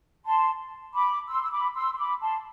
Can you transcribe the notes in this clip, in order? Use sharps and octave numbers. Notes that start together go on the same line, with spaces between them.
A5 C6
B5 D6
C6 E6
E6
B5 D6
C6 E6
C6
B5 D6
A5 C6